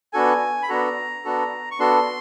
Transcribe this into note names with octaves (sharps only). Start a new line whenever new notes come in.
B3 D4 F#4 A4 G#5
B5
B3 D4 F#4 A4 A#5
B3 D4 F#4 A4
C#6
B3 D4 F#4 A4 C6